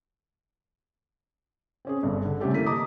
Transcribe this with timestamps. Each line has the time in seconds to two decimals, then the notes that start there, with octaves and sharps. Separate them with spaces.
1.85 C4 C#4 G#4
2.03 G1 G2
2.25 D3
2.40 C3 G3 A3 C#4 G4 A4
2.53 E3 A#3 A4 B6 D#7
2.66 D#5 A5 A#5 D6 D#6